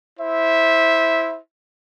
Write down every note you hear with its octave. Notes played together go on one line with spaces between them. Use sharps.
E4 C5 E5